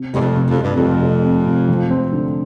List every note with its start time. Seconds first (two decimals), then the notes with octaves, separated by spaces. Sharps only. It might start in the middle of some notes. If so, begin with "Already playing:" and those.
Already playing: C3
0.13 F1 G2
0.20 F2
0.35 C3
0.50 F2
0.57 F1
0.63 G2
0.76 F1 F2
1.02 F1
1.24 C3
1.46 C3
1.69 F3
1.90 C4
2.13 D3